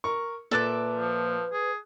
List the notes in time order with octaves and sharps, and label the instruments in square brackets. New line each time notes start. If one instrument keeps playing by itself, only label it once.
[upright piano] A#4 C#6
[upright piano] A#2 F#6 [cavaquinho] A4 D5 E5 [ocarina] B4
[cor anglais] F3
G#4